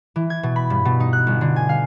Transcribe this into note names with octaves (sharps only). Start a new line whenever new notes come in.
E3
G#6
B2
B5
G2
B2
D#4
F#6
G1
D3
G#5
F5